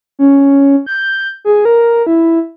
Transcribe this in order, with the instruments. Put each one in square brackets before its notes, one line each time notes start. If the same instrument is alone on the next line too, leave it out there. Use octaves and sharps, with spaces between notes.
[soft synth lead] C#4
G6
G#4
A#4
E4